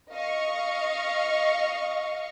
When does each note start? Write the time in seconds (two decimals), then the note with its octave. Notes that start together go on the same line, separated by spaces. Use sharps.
0.11 D#5 F5 C#6